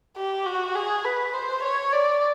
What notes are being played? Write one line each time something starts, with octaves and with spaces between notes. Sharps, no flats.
G4
F#4
G#4
B4
C5
C#5
D5